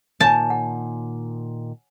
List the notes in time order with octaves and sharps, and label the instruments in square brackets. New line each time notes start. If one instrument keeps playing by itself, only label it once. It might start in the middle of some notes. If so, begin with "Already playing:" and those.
[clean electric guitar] A#2 D#3 [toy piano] C#5 G#5 [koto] A5
[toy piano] F#5